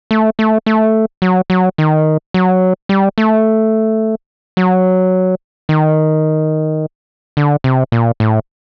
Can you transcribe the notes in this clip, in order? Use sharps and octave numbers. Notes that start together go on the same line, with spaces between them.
A3
A3
A3
F#3
F#3
D#3
F#3
G3
A3
F#3
D#3
D3
C3
A#2
A2